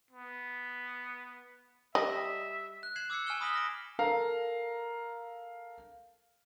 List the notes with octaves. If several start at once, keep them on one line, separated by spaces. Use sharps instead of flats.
B3
G3 D#5 E5
F#6
G#6 C7 E7 F#7
D6 E6 G#6 C7 C#7
G#5 C#6 F6 E7 G7
B5 D#6 A#6 B6 F#7 G7
F6 A#6 D7
A4 A#4 F5 A#5